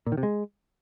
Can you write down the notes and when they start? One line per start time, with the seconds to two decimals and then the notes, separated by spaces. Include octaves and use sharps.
0.06 A#2
0.12 D#3
0.18 C3
0.23 G#3